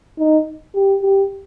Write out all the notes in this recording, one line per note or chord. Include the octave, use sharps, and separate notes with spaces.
D#4
G4
G4